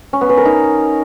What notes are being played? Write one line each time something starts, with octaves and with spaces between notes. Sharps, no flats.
C#4
B3
B4
A#4
D#4